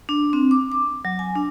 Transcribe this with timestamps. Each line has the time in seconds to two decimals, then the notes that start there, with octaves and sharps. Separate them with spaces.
0.09 D4
0.33 C4
0.51 D6
0.72 D6
1.05 F#3
1.19 G#5
1.35 D4